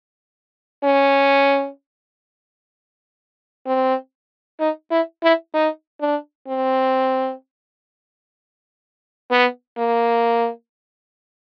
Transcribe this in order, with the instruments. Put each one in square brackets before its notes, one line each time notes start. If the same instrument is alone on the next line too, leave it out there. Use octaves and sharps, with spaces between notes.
[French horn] C#4
C4
D#4
E4
E4
D#4
D4
C4
B3
A#3